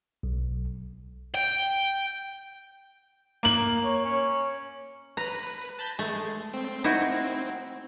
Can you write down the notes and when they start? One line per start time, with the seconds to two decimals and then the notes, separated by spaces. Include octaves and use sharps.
0.23 B1
1.35 G5
3.43 A#3 F#7
3.84 C#5
4.05 C#4
5.17 B4 A#5
5.79 A5 B5 G6
5.99 G#3 A3
6.53 C4
6.84 D#4 E4 F#4